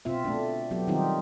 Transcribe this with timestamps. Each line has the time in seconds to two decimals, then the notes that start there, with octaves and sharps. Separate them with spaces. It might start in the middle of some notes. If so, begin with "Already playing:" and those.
0.05 B2 C4 F4 E5
0.25 A3 D4
0.71 F#3 B3 G4
0.87 D#3 G3 C4 D#4 F4 G4